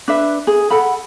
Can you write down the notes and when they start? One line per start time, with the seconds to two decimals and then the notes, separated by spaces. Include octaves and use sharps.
0.08 D4 B4 E5
0.47 G#4
0.70 A4 F#5 B5